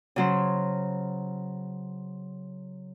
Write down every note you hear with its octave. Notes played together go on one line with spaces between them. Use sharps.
C#3 F#3 C5